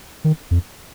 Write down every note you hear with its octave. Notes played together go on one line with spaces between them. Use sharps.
D#3
F2